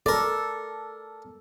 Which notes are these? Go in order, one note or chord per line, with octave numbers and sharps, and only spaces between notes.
A4 A#4 D5